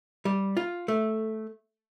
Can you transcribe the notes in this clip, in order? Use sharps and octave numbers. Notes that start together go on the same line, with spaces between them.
G3
F4
A3